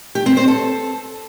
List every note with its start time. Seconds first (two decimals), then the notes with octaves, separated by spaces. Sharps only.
0.15 G4
0.26 C4
0.37 C5
0.48 A4